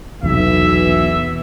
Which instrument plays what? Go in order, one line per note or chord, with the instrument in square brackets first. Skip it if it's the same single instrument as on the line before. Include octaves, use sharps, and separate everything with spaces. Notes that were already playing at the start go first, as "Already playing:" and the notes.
[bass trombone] B1 [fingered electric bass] E2 C3 F#3 [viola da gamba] E3 B3 [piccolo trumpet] E5